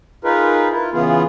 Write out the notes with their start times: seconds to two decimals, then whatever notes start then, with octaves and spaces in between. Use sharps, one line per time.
0.24 D#4 F4 G#4 A#4 B4
0.71 E4 F4
0.93 C#3 E3 B3 F4 G#4